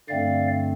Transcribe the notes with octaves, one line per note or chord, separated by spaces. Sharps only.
G2 D3 A3 C4 D5 F5